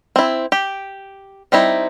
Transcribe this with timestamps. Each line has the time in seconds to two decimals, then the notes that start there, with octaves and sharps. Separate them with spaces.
0.16 C4 E4
0.52 G4
1.52 G3 C4 D#4 E4